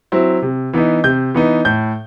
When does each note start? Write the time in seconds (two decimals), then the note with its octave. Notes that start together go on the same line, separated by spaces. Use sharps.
0.12 F#3 C4 E4
0.42 C3
0.73 E3 B3 D#4
1.04 C3 G6
1.34 E3 B3 D#4
1.65 A2 G6